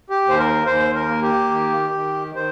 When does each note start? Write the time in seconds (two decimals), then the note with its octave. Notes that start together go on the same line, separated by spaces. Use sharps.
0.10 G4
0.25 D#2 C5
0.39 A#4
0.66 D#2 C5
0.95 A#4
1.09 A#3
1.22 G4
1.51 D#3
1.93 D#3
2.35 D#3 C5